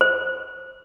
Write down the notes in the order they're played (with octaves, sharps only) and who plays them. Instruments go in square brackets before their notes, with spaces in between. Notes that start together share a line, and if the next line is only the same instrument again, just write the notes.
[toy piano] C5